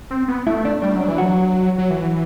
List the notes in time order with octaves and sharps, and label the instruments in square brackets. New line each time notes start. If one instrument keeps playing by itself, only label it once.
[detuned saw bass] C4
B3
[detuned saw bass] A3 [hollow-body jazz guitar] E4
[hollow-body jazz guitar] D4
[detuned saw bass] G3 [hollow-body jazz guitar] D4
[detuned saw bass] F#3
[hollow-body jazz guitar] D4
[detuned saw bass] E3
[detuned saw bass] F#3 [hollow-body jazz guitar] F#4
[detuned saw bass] F#3
E3